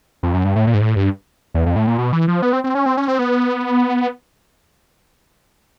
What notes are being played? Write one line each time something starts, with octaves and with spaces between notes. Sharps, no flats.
F2
F#2
G2
A2
A#2
G#2
A2
G2
E2
F2
A2
A#2
B2
E3
F3
B3
C4
C4
C#4
C4
C#4
C4
B3